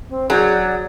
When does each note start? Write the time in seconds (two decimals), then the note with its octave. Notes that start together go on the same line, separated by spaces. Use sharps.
0.10 C4
0.30 F#3 G#4 D5 G6